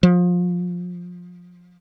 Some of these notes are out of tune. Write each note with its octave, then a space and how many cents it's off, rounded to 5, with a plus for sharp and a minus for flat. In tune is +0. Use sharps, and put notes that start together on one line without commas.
F3 +25